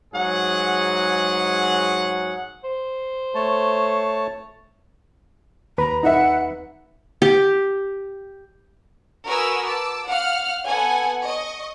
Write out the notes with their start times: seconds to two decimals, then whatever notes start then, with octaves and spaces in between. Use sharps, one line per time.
0.14 G#2 F#3 G#4 F#5
2.64 C5
3.35 A3 C#5 A5
5.78 D#2 B4 A#5 B5
6.03 D#4 E5 F#5
7.22 G4
9.26 F#4 A#4 B4 G#5 D#6 E6
9.65 A5 D6 E6
10.07 F5 F#5 F6
10.67 B3 A4 F#5 G#5
11.27 D#5 C#6